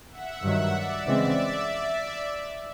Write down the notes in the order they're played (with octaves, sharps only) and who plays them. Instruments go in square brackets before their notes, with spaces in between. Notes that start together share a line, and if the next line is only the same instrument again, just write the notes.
[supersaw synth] E5 F#5
[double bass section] G2 D#3 F#3 [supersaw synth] E5 F#5
[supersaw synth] D5 E5
[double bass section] C#3 E3 G#3 C4 [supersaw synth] D5 E5